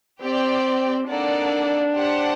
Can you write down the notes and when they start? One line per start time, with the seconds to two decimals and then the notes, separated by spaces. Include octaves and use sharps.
0.23 C4 G4 D5 G5
1.09 A#3 D4 D#4 A4 D5 F#5
1.95 G4 C5 F#5 A5